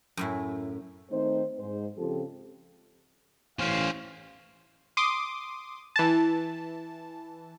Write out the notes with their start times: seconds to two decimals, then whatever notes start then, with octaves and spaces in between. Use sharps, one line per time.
0.17 F#2 A2 E4
1.11 D#3 A3 C4 D#4 C5
1.59 G#2 G#3 C5
1.98 C#3 F3 C4 F4 G4 A4
3.59 A1 C#4 C5 F5
4.97 C6 D6 D#6
5.96 E3 A5